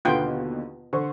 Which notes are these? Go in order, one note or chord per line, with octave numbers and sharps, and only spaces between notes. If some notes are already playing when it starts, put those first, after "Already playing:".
D#2 B2 D3 B3 F4 G5
D3 C5 C#6